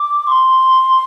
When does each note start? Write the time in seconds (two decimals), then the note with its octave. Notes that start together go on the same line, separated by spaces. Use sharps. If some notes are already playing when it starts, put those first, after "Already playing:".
Already playing: D6
0.27 C6